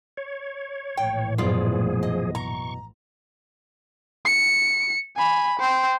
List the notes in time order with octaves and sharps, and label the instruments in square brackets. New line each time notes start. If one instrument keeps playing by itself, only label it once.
[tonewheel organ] C#5
[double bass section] A#1 A2 E3 [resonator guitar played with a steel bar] G5
[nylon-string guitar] F#2 B2 E4 [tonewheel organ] F3 G#4 [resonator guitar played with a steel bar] F4 D5
[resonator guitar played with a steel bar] D#5
[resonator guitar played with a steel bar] A#5 [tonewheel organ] C#6
[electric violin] C#7
G#5 B5
C5 G5